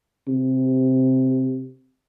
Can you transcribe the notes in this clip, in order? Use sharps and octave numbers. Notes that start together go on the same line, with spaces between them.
C3